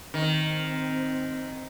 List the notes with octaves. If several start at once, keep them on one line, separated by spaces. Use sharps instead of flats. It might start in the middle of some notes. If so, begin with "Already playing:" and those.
D#3 C4